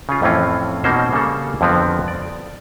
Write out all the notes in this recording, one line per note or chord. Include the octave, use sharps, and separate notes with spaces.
C#3 C#4 F4
F2 A2 E3 C4 C#4 F4
B2 A#3 C4 C#4 D#4 C5
C#3 G3 A#3 A4
F2 D3 F3 B3 C4
D5